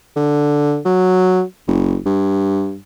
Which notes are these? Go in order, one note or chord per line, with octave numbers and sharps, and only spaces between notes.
D3
F#3
F#1
G2